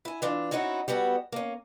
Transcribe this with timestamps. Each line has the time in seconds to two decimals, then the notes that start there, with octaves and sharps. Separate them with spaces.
0.05 E4 G#5
0.22 E3 D4 F4
0.51 C4 C#4 D#4 E4 F#4
0.88 G3 B3 F#4 A4
1.32 A#3 C#4